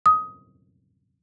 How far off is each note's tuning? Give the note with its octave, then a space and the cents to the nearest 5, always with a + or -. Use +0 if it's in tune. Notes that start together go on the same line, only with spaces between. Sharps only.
D#6 +15